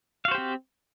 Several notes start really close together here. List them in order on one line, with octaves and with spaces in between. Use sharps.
F5 F#4 C5 G4 C4